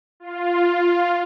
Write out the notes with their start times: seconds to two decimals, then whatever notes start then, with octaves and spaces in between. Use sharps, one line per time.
0.20 F4